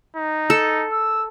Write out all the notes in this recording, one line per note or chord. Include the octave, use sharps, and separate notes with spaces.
D#4
A4
E6